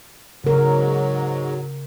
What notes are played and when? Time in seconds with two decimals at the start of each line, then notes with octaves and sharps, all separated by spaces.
0.44 G#2 C#3 F#3 A#4